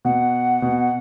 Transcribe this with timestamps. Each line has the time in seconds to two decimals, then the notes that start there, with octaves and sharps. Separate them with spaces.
0.05 B2 F#5
0.62 B2